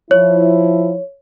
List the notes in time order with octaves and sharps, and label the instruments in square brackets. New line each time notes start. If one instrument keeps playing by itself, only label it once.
[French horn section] F3 E4 [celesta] C#5